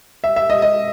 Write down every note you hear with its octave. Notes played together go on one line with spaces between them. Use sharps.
E5
E5
D#5
D#5